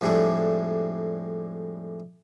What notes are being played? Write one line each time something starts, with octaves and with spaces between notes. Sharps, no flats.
F2 A2 G3 G#3 D4 E4